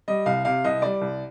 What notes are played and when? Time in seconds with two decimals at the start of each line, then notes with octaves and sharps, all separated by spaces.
0.08 G3 D#5
0.26 C2 F5
0.45 C3 F5
0.64 C2 D#5
0.82 G3 D5
1.01 C2